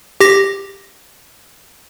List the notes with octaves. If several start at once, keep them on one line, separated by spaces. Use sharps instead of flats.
G4 A#6